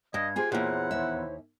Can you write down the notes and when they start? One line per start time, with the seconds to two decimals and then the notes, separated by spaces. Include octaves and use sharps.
0.14 G2 D#5 F5 G#6
0.36 F4 G4 G#4 C5 G#5
0.52 E2 A#2 E4 C5 C#5 F#5
0.91 D#2 E5